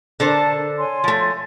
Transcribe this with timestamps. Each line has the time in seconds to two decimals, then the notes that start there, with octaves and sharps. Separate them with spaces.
0.20 D3 D4 A4 A#4 C5 A5
0.78 C#5 G#5 C6
1.04 F3 A3